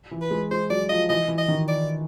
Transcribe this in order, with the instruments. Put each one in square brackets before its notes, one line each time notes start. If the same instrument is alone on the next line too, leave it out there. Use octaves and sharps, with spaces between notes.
[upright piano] E3
[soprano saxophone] B4
[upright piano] G#3
[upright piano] G#3 [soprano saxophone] C5
[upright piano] F#3 [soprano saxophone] D5
[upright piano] F3 [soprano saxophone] D#5
[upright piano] E3 [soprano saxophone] D#5
[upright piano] E3
[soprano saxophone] D#5
[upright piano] D#3
[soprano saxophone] D5